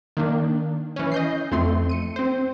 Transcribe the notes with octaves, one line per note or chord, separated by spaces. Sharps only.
D#3 A#3 D4
E3 C#4
D#5 G6 C7
F2 A3 C4 C6
C#7 D#7
C4 C5